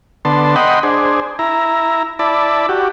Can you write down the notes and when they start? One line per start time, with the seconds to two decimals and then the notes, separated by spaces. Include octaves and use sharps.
0.25 D3 B3 A5 C6
0.56 D#5 F#5 G5 B5 C6
0.83 D4 G#4 C5
1.39 E4 A#5
2.19 E4 D5 A5 B5
2.69 F#4 G4